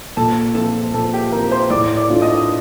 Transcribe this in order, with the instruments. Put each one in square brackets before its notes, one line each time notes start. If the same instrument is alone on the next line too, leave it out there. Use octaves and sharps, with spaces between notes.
[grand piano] A#2 [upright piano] A4 A5
[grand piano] F3 C4 F4 [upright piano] A4 A5
[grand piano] A#2 [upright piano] A4 A5
[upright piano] G4 G5
[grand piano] F3 C4 F4 [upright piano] A#4 A#5
[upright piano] C5 C6
[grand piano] A2 [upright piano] D5 D6
[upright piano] D5 D6
[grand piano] A3 D4 F4
[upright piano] D#5 D#6
D#6